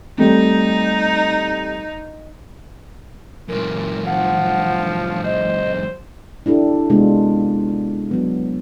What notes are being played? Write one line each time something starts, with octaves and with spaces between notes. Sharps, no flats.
G3 A3 C4 D#4
F#2 A#2 A#4
F3 F#5
C5 D#5
D4 E4 G4 A4
C3 G#3 B3 D4 F4 F#4
F#3 B3